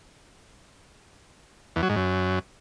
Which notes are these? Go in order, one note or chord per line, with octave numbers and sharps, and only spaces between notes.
E2
F#3
G#2
F#2